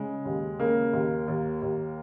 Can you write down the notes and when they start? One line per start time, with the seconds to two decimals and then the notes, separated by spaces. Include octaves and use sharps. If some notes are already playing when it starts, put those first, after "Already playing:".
Already playing: C#3 G#3
0.25 D#2
0.59 C#3 A#3
0.93 D#2
1.28 D#2
1.62 D#2